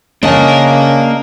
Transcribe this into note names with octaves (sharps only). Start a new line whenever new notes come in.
C#3 A#3 D4 A#4 C#5 D#5 F5 G#5